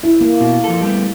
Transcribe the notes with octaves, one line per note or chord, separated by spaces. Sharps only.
E4
A#3
B2
F3 A4
G3 A3 B3